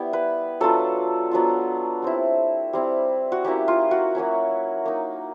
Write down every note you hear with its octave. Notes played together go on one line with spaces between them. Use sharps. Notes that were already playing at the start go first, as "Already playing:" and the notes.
Already playing: G3 B3 E4
B4
F#3 B3 D4 F4 A4
F#3 B3 D4 F4
G3 C4 E4
G3 C4 E4
F#4
F#3 A#3 C#4 E4 G4
F4
F#4
F#3 A#3 C#4 E4
A#3 D#4